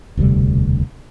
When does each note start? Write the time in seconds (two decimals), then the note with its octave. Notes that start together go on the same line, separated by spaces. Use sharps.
0.17 E1 D2 C3 G3